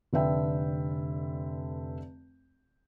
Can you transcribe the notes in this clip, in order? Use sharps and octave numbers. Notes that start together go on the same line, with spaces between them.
F1 D3 B4 E5 G5